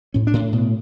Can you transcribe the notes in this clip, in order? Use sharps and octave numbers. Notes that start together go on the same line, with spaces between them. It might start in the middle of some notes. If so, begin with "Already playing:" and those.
A2 C#4
D4
A2
B2